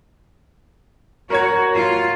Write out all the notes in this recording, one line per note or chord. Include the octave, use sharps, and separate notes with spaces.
F#4 A#4 C#5 G#6
F4